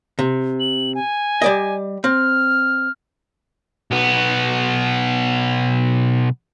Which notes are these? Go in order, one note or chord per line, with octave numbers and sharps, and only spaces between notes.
C3
F#7
G#5
G3 D5 D#5
C4 F6
B1 B3